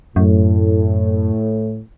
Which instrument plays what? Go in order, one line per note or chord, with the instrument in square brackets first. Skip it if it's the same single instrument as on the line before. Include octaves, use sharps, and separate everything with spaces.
[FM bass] F#2 [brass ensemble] A2